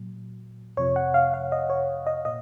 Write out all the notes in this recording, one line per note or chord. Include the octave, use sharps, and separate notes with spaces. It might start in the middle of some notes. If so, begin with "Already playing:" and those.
Already playing: A#2 F#3
F2 C3 F3 C#5
F#5
F5
F5
D#5
C#5
D#5
A#2 D#5